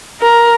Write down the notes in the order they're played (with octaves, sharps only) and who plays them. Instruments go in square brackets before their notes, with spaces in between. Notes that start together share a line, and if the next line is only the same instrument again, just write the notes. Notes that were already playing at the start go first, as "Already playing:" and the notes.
[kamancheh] A#4